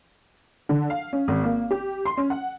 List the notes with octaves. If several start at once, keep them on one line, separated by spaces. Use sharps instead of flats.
D3
F5
C#4
G#1
A#3
G4
C6
C#4
F#5